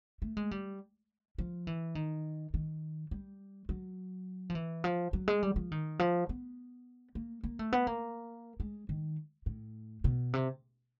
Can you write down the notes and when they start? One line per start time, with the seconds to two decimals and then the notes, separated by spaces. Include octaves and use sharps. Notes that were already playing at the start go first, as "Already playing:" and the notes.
0.22 A3
0.37 G#3
0.51 G3
1.38 F3
1.67 E3
1.95 D#3
2.54 D#3
3.11 G3
3.69 F#3
4.50 F3
4.55 E3
4.84 F3
5.13 F#3
5.28 G#3
5.43 G3
5.56 F3
5.72 D#3
5.99 F3
6.29 B3
7.15 A#3
7.44 A#3
7.59 A3
7.73 B3
7.87 A#3
8.60 G#3
8.89 D#3
9.46 A2
10.04 B2
10.33 C3